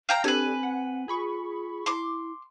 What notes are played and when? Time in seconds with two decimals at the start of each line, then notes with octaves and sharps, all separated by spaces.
0.09 F5 G5 A#5
0.24 C4 D4 G4 A4 B4 G#5
0.63 F#5
1.08 F4 G#4 B5 C#6
1.86 E4 C6 D6